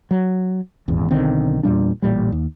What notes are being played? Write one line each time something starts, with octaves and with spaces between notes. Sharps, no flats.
F#3
D#1 G#1 E2
B1 D3 D#3 C4
E2 A#2 G3 D4
A1 A#2 G3
D#2